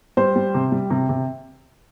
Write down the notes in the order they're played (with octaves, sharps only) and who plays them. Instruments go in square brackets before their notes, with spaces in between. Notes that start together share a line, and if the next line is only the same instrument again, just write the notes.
[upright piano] G3 C5
G3
C3
G3
C3
C3